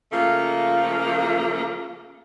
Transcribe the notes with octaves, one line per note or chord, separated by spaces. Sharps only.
C#3 F3 A3 A#3 F4